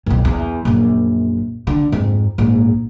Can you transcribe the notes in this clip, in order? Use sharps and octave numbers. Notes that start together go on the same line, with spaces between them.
B1 F2
E2
A#1 F#2
D3
F2 G#2
A#1 G#2